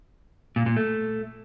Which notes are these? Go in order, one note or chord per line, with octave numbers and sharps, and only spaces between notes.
A#2
A#2
A3